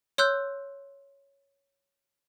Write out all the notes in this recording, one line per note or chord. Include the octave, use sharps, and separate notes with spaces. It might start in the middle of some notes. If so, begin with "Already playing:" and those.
C#5 C6 E6 F#6 G6